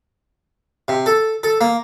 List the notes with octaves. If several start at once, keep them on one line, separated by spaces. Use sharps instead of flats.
C3
A4
A4
A#3